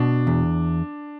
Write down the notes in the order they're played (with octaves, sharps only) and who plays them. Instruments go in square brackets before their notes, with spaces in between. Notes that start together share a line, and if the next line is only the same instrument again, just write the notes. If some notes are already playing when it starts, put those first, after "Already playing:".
Already playing: [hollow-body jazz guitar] B2 [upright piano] D4
[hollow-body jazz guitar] E2